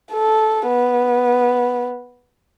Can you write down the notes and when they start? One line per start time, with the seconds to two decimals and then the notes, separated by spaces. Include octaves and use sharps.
0.12 A4
0.68 B3